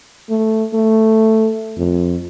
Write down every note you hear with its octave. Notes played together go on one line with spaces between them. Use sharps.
A3
A3
F2